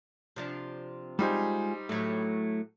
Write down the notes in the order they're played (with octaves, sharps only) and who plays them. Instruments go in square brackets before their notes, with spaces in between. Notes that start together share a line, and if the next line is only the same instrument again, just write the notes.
[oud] C3 F3 D4
[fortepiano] G3 D#4 C5 [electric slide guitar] G#3 F4 G#5
[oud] A2 F#3 [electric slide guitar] A3